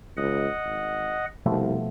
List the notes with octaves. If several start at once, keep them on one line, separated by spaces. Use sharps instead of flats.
C#2 D#5 F#5
G#1
C2 B2 F3 A3